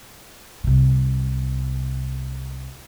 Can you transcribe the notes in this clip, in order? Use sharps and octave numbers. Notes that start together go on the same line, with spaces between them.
C2 C3